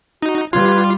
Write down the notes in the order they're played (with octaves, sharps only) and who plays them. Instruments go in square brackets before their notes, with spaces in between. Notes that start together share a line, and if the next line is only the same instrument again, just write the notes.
[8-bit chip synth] D#4 [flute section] F#4
[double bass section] G3 [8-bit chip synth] F4 [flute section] B4 F#6 G#6 [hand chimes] C6